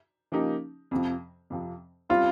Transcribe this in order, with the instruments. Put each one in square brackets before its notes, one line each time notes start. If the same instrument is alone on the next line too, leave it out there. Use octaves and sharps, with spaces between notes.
[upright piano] C#3 F3 A#3 D#4 G4
F2 C3 F3
F2 C3 F3
[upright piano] C#3 G3 C4 [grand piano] F4